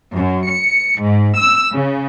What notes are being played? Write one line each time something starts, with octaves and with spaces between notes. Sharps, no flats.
F#2
C#7
G#2
E6
C#3